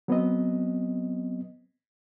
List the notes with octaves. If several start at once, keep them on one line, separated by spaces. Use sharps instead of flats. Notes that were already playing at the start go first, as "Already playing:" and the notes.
F#3 B3 C4 D#5